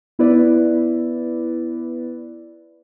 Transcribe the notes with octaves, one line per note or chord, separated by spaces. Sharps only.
B3 E4 B4 D5